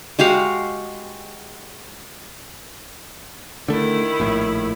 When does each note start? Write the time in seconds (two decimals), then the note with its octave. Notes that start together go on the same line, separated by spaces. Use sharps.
0.19 G#3 F#4 G4 F5
3.68 D3 D#3 A3 E4
4.20 A#1 A2